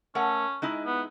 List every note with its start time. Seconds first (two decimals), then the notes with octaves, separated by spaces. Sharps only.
0.15 A3 C#4 A#4 F#5
0.62 G#3 D#4 E4
0.86 B3